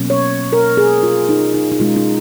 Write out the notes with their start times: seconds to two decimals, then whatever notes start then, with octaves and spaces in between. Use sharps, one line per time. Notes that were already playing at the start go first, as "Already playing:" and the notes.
Already playing: B2 F#3 A#3 C#4
0.10 C#5
0.53 A#4
0.77 G#4
1.03 F4
1.29 D#4
1.54 D#4
1.72 D#4
1.79 B2 G#3 C#4 F4
1.96 D#4